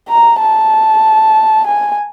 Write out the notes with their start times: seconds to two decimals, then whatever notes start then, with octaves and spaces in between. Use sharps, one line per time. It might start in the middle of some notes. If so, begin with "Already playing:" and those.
0.09 A#5
0.41 A5
1.67 G#5